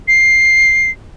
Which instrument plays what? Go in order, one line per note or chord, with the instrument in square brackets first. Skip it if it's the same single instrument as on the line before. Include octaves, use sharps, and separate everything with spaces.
[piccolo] C7